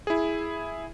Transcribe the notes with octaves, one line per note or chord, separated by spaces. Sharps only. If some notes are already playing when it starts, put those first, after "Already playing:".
E4 G#4